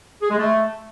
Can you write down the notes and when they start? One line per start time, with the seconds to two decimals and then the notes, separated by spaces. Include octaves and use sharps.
0.22 G#4
0.30 G#3
0.39 A3